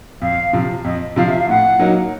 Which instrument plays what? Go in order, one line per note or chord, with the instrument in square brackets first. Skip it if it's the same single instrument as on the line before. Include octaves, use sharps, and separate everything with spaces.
[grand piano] F2 [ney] F5
[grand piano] C3 F3
[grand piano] F2 [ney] D#5
[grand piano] C3 F3 [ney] F5
[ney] E5
F5
[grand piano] A2 [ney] F#5
[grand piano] F#3 A#3 D#4